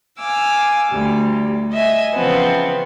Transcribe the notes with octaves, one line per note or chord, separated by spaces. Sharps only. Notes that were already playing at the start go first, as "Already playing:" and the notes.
F5 G#5 D6 E6
D2 G3
D#5 E5 G#5
C#3 E3 F3 B3 C4